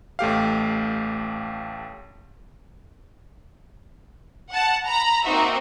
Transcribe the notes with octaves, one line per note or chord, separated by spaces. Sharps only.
A1 A3 G4 F5
F#5 A5
A#5 B5
A#3 C4 D#4 F#4 E5